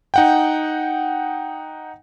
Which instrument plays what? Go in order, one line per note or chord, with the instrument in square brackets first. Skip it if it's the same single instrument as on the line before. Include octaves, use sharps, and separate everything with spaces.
[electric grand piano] D#4 F#5 G5